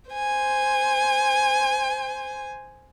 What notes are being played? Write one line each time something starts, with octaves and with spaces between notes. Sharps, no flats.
C5 G#5